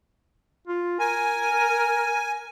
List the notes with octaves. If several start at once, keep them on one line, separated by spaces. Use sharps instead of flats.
F4
A#4 G#5